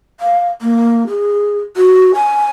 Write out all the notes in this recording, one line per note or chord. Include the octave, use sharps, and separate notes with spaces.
F5
A#3
G#4
F#4
G#5